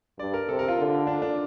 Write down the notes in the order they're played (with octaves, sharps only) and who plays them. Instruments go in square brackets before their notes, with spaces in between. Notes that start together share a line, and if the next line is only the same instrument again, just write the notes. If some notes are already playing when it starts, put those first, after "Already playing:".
[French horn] G2 [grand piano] D5
[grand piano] A#4
[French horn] C3 [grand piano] A4
[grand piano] A#4
F4
[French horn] D3
[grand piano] D4
D4